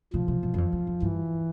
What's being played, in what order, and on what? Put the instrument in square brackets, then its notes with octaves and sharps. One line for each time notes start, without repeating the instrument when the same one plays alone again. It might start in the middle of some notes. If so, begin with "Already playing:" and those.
[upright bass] B2 [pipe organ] F3
[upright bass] C3
B2
F#2
F2
F2
F2
[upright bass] G2 [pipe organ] E3